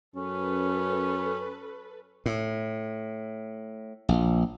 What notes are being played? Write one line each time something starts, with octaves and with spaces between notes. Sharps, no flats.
F#2 C#4 A4 B4
A2
A#1